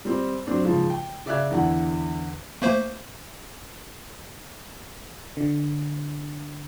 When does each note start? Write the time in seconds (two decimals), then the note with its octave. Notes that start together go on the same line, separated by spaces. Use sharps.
0.05 G3 C4
0.47 F#3 C4 D4
0.64 G#2 C#3 F3
0.90 G5
1.26 C#3 D5 E5 F5 F#6 G#6
1.51 E2 D3 E4 F#5
2.62 A3 A#3 C5
5.37 D3